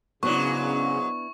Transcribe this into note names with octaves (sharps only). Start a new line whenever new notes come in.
G#2 C#3 F#3 B3 D4 E4 C#6